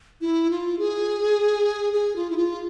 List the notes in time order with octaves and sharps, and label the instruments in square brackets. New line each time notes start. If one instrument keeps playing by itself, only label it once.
[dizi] E4
F4
G#4
G#4
F4
E4
F4